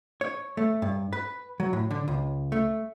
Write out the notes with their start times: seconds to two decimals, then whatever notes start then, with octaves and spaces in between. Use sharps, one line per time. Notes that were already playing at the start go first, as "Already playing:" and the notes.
0.21 C#5
0.57 A3
0.82 G2
1.13 B4
1.60 F#3
1.73 A2
1.91 D3
2.08 C#2
2.52 A3